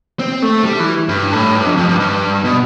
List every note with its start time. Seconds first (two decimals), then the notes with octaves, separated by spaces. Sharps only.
0.19 C4
0.42 A3
0.64 G3
0.80 E3
1.09 G2
1.33 A2
1.54 G2
1.66 F2
1.76 F2
1.89 G2
2.00 G2
2.45 B2